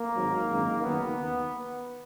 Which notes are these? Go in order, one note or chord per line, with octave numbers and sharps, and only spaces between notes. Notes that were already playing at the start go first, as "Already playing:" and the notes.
Already playing: A#3
G#1 G#2 F#3
G#1 F#2 D#3 G#3
F#1 F#2 D#3 A#3 B3
D#2